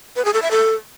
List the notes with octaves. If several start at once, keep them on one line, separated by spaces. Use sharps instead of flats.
B4
G#4
A4
E5
A4